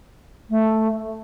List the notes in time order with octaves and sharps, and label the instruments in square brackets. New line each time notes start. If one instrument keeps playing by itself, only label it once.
[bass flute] A3